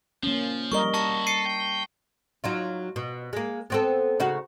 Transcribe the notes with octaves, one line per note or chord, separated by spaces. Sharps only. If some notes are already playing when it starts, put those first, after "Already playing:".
F3 A#3 C#4
G3 A#4 D#5 C#6 G7
E4 F#4 A5 C#6 A#6
A4 C7 C#7 D#7
G5
F#3 D#4 F4
B2
G#3 A#3
B3 C4 A4
C#3 D#4 F#4